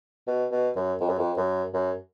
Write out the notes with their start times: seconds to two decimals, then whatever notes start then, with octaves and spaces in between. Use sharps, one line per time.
0.27 B2
0.52 B2
0.76 F#2
1.00 F2
1.09 F#2
1.18 F2
1.37 F#2
1.74 F#2